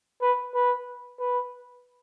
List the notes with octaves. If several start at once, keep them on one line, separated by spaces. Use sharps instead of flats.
B4
B4
B4